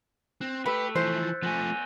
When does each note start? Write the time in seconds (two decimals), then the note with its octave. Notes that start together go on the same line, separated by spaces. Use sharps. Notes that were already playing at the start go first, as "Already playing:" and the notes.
0.41 C4 F#6
0.66 A3 G4 B4 E6 C#7
0.95 E3 F3 C5 F#6 G6 B6
1.19 E6 A6
1.43 F3 A3 B3 G#5 F#6 A#6